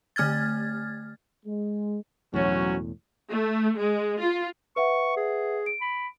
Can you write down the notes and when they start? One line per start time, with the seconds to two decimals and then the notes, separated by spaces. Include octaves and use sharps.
0.16 D3 A3 F6 G#6 A6
1.46 G#3
2.34 E1 A#1 E2 A2 F#3 C#4 F#4
3.30 A3
3.78 G#3
4.20 F4
4.76 B4 E5 F#5 C#6
5.17 G#4
5.66 D7
5.81 B5